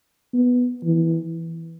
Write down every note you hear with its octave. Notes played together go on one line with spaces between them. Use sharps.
B3
E3